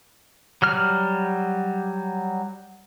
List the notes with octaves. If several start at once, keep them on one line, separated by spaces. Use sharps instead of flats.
F#3 G3 F6